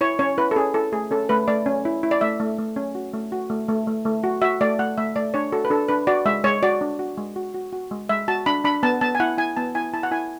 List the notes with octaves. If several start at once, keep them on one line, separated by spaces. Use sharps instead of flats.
E4 C#5
C#4 C#5
E4 B4
A4
C#4 G#4
E4 A4
A3 G#4
C#4 A4
A3 B4
A3 D5
C#4
E4
E4
D5
A3 E5
A3
A3
C#4
F#4
A3
F#4
A3
A3
A3
A3
F#4
F#4 E5
A3 D5
A3 F#5
A3 E5
A3 D5
D4 C#5
F#4 A4
B4
D4 A4
D4 B4
F#4 D5
G#3 E5
G#3 C#5
F#4 D5
D4
F#4
G#3
F#4
F#4
F#4
G#3
G#3 E5
F#4 A5
D4 B5
D4 B5
B3 A5
B3 A5
G#5
E4 F#5
E4 G#5
B3 A5
E4 G#5
E4 A5
F#5
E4 G#5